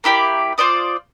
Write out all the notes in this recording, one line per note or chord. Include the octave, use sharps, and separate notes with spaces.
A#3 E4 G4 D5
F4 C5 D5 D#6